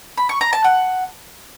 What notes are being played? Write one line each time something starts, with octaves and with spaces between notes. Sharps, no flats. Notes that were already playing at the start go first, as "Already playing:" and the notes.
B5
C#6
A#5
A5
F#5